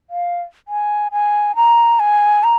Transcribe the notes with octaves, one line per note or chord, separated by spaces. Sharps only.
F5
G#5
G#5
A#5
G#5
A#5